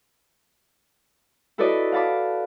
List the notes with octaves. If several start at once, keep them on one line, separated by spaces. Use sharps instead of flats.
E4 F#4 A4 B4 D5 D#5
F5 F#5 A5 B5 D6